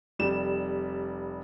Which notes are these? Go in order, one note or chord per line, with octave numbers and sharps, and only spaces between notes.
F1 G3 E7